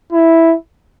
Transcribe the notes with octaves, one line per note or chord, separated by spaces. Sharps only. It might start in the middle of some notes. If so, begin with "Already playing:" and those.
E4